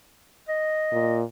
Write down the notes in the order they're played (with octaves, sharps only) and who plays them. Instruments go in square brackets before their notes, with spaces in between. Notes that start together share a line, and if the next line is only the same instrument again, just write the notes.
[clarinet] D#5
[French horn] A#2